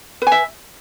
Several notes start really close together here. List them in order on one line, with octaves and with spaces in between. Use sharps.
B4 G#5 E5